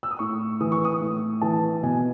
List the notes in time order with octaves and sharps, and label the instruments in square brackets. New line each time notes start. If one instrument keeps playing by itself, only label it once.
[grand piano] E6
D#6
A2 C#6
E3 D#6
C#6
D#6
A2
E3 A5
B2 G#5